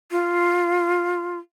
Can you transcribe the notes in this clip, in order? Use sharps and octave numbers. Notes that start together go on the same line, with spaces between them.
F4